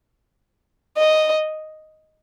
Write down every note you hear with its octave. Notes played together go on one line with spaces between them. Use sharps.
D#5